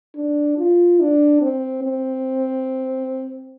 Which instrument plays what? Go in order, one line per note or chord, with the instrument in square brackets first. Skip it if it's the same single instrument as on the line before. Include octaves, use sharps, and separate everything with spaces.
[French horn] D4
F4
D4
C4
C4